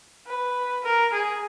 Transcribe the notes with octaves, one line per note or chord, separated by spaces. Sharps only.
B4
A#4
G#4